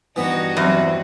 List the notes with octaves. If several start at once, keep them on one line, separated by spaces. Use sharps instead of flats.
G2 E3 B3 D#4 F#4
E2 F#3 C4